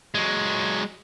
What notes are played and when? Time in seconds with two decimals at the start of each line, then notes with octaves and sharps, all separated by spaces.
0.15 F#3 G#3